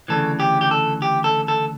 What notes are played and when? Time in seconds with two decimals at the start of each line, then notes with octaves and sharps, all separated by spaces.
0.08 D2 C#3 E3 A4
0.40 G4
0.61 G4
0.71 A4
1.02 G4
1.24 A4
1.48 A4